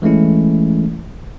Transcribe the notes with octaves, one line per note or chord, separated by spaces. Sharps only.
E3 G#3 A3 C#4 E4